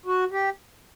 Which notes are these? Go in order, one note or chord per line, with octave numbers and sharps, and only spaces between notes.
F#4
G4